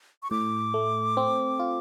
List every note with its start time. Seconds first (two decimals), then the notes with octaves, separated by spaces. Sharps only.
0.23 C#6
0.31 A2 D6
0.74 A3
1.17 C4
1.60 F4